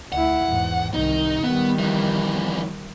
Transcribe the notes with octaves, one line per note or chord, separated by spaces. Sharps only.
D2 E4 F#5
E2 G#2
C2 D#3 D#4
D#3 G3 B3
F2 E3